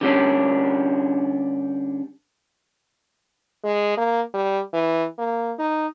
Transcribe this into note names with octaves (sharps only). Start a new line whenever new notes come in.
D3 G3 C#4 D4
G#3
A#3
G3
E3
A#3
D#4